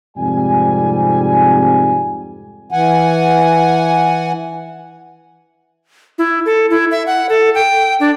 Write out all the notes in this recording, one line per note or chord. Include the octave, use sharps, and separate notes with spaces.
F2 G#2 C3 G3 G#5
E3 F#5 G#5
E4
A4
E4
E5
F#5
A4
G5
D4